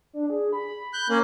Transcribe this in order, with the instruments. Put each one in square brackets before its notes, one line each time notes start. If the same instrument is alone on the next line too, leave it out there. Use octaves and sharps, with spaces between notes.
[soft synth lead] D4
G#4
B5
[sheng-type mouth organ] F#6 G6
A#3 C#4